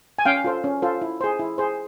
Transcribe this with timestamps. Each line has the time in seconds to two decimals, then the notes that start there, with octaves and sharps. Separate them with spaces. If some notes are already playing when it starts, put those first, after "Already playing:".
0.19 G#5
0.25 C#4 F5 G5
0.44 F4 A4 C5
0.64 C#4
0.82 F4 A4 C5
1.02 E4
1.21 G#4 C5
1.39 E4
1.58 G#4 C5